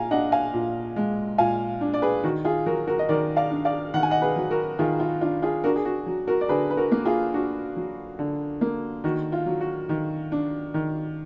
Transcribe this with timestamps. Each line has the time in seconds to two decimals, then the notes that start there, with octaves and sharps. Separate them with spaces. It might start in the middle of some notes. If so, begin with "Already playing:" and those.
Already playing: A#2 F5 G#5 A#5
0.11 D4 D#5 F#5
0.32 F5 G#5
0.54 A#2
0.96 G#3
1.38 A#2 F5 G#5
1.81 D4
1.94 D5
2.02 G#4 B4
2.24 D#3 F#4
2.45 F4 G#4
2.66 F#3 F#4 A#4
2.87 F#4 A#4
2.99 D#5
3.09 D#3 A#4 D5
3.37 D5 F5
3.51 D4
3.65 D5 F5
3.94 D#3 F#5
4.03 G#5
4.11 D#5 F#5
4.22 G#4 B4
4.36 F#3
4.51 F#4 A#4
4.79 D#3 F4 G#4
5.00 F4
5.21 D4 F4
5.42 F4 G#4
5.64 D4 F#4 A#4
5.76 G#4
5.85 F#4
6.06 F#3
6.27 F#4 A#4
6.41 D5
6.49 D3 G#4 B4
6.70 B4
6.77 F#4 A#4
6.92 A#3
7.05 F4 G#4
7.34 D4 F#4
7.76 F#3
8.19 D3
8.61 A#3
9.04 D#3 F#4
9.32 F4
9.46 F#3
9.61 F#4
9.89 D#3
10.32 D4
10.74 D#3